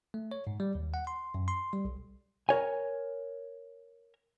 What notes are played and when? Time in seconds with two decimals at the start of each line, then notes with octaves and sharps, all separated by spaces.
0.14 A3
0.31 C#5
0.47 G#2
0.60 G3
0.75 D#2
0.94 F#5
1.07 C6
1.34 F#2
1.48 C6
1.73 G3
1.85 B1
2.49 A#4 C#5 G#5